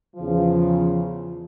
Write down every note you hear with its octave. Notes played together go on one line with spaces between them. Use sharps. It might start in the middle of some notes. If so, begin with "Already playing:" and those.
E2 C#3 F3